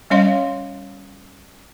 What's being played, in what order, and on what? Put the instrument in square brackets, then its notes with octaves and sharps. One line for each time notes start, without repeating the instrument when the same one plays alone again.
[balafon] G3 C#4 C#5 D#5 F5 C6